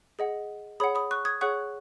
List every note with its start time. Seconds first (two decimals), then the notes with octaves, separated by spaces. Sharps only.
0.19 G#4 D#5 F#5
0.80 G#4 C#5 F#5 B5 D#6
0.95 B5 D#6
1.11 C#6 F#6
1.25 D#6 G#6
1.41 G#4 C#5 F#5 C#6 F#6